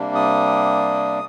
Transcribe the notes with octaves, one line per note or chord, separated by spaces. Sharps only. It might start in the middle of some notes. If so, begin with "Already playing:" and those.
Already playing: C3 G3 A#3 D4
D#6